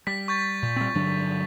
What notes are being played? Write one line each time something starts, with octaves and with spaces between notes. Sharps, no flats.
G3 B6
C#6 G6 A6
A#2
G3 C4
G2 D3 F#3 D4